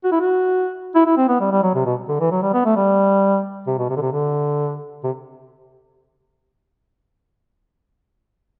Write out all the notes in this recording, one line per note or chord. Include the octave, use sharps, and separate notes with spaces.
F#4
E4
F#4
E4
E4
C4
B3
G3
G3
F#3
C3
B2
D3
E3
F#3
G3
B3
A3
G3
C3
B2
C3
D3
C3
D3
C3